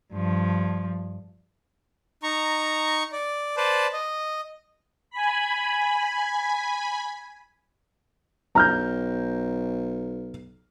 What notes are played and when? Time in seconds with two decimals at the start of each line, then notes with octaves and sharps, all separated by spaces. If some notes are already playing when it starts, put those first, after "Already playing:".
0.13 G2 F3
2.23 D#4 A#5 C#6
3.12 D5
3.57 B4 C5 D5 A5
3.93 D#5
5.10 G#5 B5
8.55 B1 A#5 F6 G6